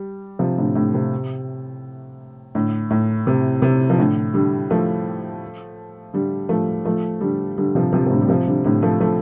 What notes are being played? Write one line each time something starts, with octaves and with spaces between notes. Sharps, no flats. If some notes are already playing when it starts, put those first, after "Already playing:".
Already playing: G3
C3 F3
A2 D3
A2 D3
C3
A2 D3
A2
C3
C3
F3
A2 D3
D3 G3
F3 A3
D3 G3
F3 A3
F3 A3
D3 G3
D3 G3
C3 F3
C3 F3
C3
A2 D3
G3
C3 F3
D3 G3
A2 D3
F3 A3
F3 A3